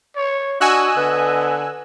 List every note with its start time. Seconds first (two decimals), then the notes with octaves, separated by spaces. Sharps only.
0.16 C#5
0.61 D4 F#4 D#5 G#5 E6 F#6
0.97 D3 B3